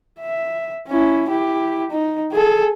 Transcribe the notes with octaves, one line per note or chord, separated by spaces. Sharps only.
E5
C#4 E4
E4 G4
D#4
G#4 A4